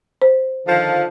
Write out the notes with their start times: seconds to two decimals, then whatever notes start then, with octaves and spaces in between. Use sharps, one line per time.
0.22 C5
0.66 D3 D#3 F3